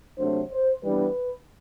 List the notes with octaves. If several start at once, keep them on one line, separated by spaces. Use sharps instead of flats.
C3 F#3 A3 D4 C5
C5
E3 G3 B3 D4 B4